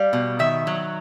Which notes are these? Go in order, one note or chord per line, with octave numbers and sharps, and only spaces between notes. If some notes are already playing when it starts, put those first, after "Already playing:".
Already playing: G3 F5
B2
D#3 E5
F#3